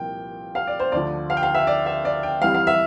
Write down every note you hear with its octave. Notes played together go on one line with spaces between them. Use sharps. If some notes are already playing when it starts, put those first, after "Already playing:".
Already playing: C2 A#2 F3 G5
F5
D5
C5
D2 D3 F3 D5
F5
G5
F5
E5
D5
E5
D5
G5
F2 E3 G3 F5
F5
E5